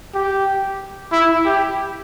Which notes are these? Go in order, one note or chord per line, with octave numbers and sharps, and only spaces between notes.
G4
E4
G4